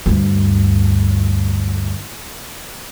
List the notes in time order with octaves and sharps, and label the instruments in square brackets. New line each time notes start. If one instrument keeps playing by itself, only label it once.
[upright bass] D2 G2